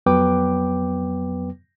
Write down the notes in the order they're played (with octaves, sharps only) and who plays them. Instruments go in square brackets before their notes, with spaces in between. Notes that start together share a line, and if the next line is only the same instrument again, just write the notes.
[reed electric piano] F2 F#3 B3 B4 G5 D6